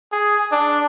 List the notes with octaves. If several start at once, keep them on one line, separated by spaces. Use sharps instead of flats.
G#4
D4